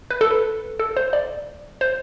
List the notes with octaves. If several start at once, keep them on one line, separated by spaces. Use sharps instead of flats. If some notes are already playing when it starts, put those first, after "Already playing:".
B4
A4
B4
A4
C5
D5
C5